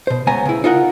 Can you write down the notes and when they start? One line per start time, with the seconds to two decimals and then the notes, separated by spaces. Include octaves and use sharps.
0.07 B2 C5
0.27 C#2 B3 C#5 G#5 A#5
0.45 C#3 E4
0.64 D#4 F4 A#4 F#5